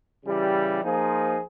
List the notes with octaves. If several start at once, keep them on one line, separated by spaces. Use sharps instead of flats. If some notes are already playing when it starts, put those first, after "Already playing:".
C#3 E3 G3
F3 A#3 D#4 G#4 C5